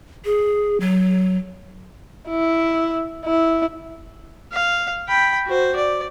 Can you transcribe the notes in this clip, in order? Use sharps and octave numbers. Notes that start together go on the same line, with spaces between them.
G#4
F#3
E4
E4
F5
G5 B5
F#4 C5
D5